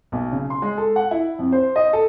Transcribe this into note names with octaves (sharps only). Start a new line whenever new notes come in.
B1
C#3
C6
G#3
A4
F#5
E4
F2
C5
D#5
A4